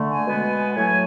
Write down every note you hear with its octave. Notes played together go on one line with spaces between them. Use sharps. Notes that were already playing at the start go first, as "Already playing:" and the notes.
Already playing: D3 A3
G#5
B2 G#3 B3
A2 F#3 A3 G#5